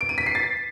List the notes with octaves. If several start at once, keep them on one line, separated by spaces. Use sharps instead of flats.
D7
D#7
B6
C7
A6